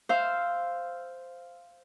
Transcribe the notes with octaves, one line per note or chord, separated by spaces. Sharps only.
C5 F5 E6